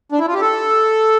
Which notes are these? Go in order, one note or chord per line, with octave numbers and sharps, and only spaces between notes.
D4
E4
F4
G4
A4